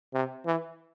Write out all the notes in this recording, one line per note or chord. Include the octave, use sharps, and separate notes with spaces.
C3
E3